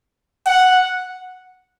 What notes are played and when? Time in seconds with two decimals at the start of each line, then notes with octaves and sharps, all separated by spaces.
0.46 F#5